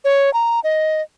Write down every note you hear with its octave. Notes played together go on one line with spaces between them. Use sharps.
C#5
A#5
D#5